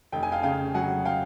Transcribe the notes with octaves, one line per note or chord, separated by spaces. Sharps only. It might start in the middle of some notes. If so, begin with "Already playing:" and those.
F1 G5
G#5
F5 G5
C#3 F5 G5
F#3 F#5 G#5
F5 G5